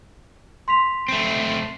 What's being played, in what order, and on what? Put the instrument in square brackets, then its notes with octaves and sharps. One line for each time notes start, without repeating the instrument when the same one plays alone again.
[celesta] C6 B6 F7
[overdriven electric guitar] A3 C4